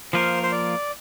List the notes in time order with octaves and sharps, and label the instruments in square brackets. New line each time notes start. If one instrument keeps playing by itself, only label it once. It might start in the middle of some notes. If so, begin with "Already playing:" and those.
[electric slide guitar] F3 A#3 F4 A#4 [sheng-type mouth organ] C5
[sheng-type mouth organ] C5
D5